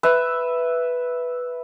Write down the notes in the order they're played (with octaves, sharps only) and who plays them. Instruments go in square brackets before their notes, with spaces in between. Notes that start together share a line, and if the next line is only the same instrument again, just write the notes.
[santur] B4 E5